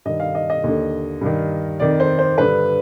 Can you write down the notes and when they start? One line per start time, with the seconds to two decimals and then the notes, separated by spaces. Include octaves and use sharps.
0.05 G2 D#3 D#5
0.20 F5
0.35 D#5
0.50 D#5
0.64 D#2 D3
1.21 G2 D#3
1.80 F2 D#3 D5
2.00 C5
2.19 C5
2.38 G2 D3 B4